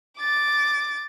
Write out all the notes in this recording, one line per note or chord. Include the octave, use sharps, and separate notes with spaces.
D6 A6